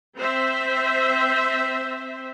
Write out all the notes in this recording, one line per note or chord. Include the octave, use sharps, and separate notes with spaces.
C4 C5 E5